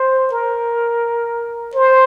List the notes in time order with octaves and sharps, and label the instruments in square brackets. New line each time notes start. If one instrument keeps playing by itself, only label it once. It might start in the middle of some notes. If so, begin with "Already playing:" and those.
Already playing: [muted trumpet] C5
A#4
C5